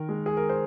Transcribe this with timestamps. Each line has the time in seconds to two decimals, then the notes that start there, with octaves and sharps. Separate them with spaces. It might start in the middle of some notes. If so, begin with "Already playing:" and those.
Already playing: D#3 A#4
0.09 G#3
0.26 G#4
0.37 A#4
0.49 C5